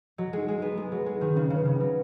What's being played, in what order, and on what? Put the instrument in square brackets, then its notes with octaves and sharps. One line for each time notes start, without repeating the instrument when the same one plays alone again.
[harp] F#3 [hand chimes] D#5
[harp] G#3 [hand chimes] D#4
[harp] G#3
[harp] B3 [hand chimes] D#4
[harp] G#3 [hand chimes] D#4
[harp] F#3 [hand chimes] B4
[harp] G#3
[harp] D#3 [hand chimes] D#4
[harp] C#3 [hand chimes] C#4
[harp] C#3
[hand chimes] B4
[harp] C#3
[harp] F#3 [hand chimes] C#4